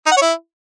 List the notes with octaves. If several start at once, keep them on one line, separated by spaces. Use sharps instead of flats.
D#4
F#5
C#5
E4